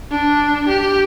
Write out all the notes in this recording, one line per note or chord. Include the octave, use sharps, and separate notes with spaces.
D4
G4